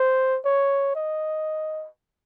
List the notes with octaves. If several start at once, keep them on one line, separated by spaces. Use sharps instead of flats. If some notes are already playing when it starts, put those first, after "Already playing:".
Already playing: C5
C#5
D#5